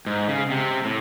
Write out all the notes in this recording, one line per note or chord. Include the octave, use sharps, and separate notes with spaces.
G#2
C#3
C3
A2